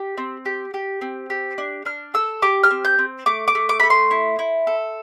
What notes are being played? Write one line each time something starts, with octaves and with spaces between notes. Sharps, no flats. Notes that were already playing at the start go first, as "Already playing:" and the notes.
Already playing: G4
C4
G4
G4
C4
G4
D4
D4 F6
A4 E6
G4 D6
F6
C4
G6
C4
A3 D6
D6
A3
D6
A3 B5
C6
E4
E4
A4